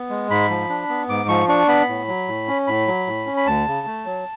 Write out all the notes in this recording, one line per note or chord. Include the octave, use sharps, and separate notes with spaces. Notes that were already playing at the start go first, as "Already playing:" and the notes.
Already playing: B3
G#3
G#2 B5
F3
D4
B3
G#2 D6
F3 C#6
D4 C#6
B3 B5
A2
F#3
A2
C#4
A2 B5
F#3
A2
C#4
B5
D2 A5
C#3
A3
F#3